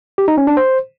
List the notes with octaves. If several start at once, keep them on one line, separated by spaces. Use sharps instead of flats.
G4
D#4
C#4
D4
C5